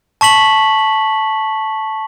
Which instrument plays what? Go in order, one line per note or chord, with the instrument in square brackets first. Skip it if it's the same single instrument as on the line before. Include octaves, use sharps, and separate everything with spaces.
[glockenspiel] A5 C#6 B6 F#7